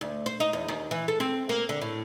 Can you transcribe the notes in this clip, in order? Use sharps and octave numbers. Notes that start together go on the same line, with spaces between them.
D2
C5
D#4
E2
D#2
E3
A4
C4
A#3
D3
A2